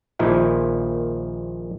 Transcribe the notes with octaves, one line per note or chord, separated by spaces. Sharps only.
A#1 A#2 D#3 F3 D#4 E4